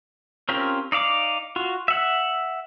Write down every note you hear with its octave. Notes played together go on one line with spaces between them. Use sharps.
C4 C#4 F4 G4 A#4
D#4 D5 F5 D6
F4 F#4
E5 F#5